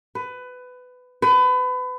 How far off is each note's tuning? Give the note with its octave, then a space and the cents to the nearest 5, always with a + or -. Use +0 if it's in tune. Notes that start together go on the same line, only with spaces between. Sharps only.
B4 +20
B4 +30